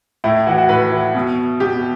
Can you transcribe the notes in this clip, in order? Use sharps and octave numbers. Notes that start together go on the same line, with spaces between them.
A2 E4
E3 F#4
F#4
A2 B4
E3
B2
B2 G4